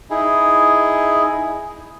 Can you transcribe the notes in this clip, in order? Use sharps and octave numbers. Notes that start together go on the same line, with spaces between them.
D#4 E4 G#4